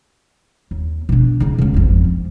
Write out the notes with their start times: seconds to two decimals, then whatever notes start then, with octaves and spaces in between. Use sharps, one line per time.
0.71 D#2
1.09 B2 D4
1.40 C#3 D#4
1.58 C#2 C#3
1.74 G#1 F2
2.04 F3